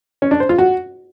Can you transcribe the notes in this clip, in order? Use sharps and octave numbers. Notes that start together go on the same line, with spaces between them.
C#4
D4
C5
F4
F#4